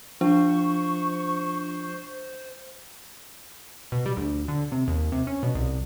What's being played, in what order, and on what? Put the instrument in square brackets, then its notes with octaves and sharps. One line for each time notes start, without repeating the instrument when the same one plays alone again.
[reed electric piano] F3 F4 [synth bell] D4 [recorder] C5 [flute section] C#6
[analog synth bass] B2
G3
D2
D3
C3
D#2
C3
C#4
B2
C2